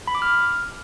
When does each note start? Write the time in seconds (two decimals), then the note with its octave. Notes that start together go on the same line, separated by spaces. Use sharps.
0.07 B5
0.15 D6
0.22 F6